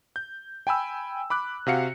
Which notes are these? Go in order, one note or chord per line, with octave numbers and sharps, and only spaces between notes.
G6
G5 G#5 B5 E6
B5 D6 F#6
C3 F#4 F5 C#7